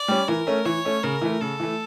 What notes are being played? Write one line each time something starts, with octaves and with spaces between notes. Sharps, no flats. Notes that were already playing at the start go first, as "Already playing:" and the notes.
Already playing: D5
G3 C#4
E3 A#4
A3 C#4
E3 C#5
A3 C#4
C#3 A#4
E3 A3
C#3 A4
E3 A3